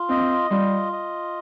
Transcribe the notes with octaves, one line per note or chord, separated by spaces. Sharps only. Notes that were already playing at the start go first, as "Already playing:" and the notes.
Already playing: F4
C4 D#5
G3 F4
D#5